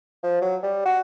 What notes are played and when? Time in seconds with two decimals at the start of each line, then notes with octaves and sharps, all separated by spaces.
0.24 F3
0.42 F#3
0.63 G3
0.86 F#4